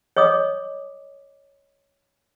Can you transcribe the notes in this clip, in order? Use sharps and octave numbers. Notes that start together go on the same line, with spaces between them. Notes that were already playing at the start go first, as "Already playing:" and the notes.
C#5 D#5 D6 D#6